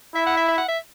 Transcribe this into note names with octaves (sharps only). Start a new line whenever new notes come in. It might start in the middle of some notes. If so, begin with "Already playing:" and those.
E4 E5
F#5
E5
E5
F#5
E5